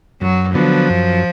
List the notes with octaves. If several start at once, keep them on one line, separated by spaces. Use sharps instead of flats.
F#2 F#3
D3 F3 F#3 B3
F#2